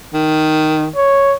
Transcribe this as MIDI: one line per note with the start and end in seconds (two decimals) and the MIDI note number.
0.13 0.88 51
0.96 1.35 73